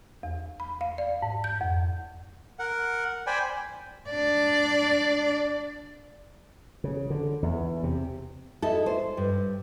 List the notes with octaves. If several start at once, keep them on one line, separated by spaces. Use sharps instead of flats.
E2
B5
F5
D5
G#2
G6
F2
A#4 F#5
C5 D5 G5 G#5 B5
D4 D5
C#3
D3
E2
C3
D#4 E4 A4
C5
G2